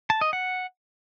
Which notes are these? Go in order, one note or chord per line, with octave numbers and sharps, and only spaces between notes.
A5
D#5
F#5